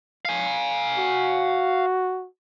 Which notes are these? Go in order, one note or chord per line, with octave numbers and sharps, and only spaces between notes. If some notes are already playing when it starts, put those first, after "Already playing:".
F5 G#5
F#4